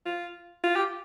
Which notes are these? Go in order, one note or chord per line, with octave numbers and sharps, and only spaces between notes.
F4
F4
G4